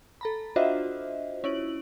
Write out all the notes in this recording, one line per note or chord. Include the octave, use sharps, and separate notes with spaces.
A4 A#5 B5
D4 F4 F#4 C5 D#5 E5
C#4 E4 D7 F#7